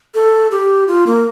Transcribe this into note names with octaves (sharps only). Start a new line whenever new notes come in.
A4
G4
F4
A#3